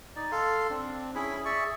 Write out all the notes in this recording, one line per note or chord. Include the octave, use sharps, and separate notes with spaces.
D#4 D5
A4 F5 C6
C4 D4
C#4 E4 G#4 B5
G#4 D5 E5 C#6